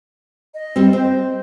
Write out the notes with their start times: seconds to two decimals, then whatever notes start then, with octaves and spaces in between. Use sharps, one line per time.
0.54 D#5
0.76 G3 C4
0.93 C4 C5